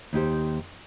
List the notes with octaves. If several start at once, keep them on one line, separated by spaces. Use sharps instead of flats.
D#2 D#4 G4 C5